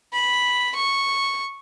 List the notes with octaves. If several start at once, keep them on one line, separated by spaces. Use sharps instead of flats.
B5
C#6